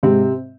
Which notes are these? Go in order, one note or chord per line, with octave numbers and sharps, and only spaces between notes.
G#2 C3 C4